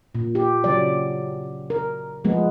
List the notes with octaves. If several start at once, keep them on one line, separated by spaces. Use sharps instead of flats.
A#2
G4
C#3 F#3 D5
A#4
F3 G#3 B3